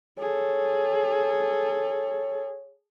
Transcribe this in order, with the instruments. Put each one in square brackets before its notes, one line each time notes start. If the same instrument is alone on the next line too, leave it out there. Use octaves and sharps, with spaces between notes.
[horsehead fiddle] G#4 A4 [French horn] C#5